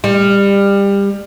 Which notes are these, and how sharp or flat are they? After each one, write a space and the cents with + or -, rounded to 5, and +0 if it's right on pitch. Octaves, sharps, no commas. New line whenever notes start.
G3 +25